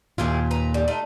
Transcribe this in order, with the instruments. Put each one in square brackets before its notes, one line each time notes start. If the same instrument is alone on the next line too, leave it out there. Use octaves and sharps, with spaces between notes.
[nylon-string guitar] D#2 A#2 F4 [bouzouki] E4 G4 G#4
[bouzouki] B4 A#5
G3
A3 D#4 F4